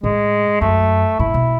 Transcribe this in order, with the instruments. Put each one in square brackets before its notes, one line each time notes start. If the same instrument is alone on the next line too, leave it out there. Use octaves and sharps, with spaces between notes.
[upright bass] A2 [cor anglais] G#3
[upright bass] F#2 [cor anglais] A3
[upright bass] A2 [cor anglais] E4
[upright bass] B2